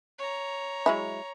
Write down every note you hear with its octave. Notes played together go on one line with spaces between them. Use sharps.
C#5 A#5
F#3 G#3 E4